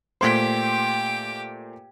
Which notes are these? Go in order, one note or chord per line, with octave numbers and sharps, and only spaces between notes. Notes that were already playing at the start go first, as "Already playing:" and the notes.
A#2 A3 G4 C5 G5 C6 G#6 B6